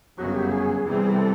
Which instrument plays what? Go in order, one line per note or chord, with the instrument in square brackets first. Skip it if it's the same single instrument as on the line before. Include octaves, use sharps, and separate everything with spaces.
[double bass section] G1 F#2 C#3 F#3 B3 [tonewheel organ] F#4
[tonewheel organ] G4
G#4
[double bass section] E2 C3 E3 G3 C4
[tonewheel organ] A4